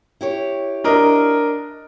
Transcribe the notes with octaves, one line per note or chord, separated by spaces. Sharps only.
E4 G4 C#5
D4 A#4 D#5